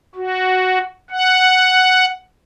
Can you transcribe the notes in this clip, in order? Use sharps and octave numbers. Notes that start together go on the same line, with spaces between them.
F#4
F#5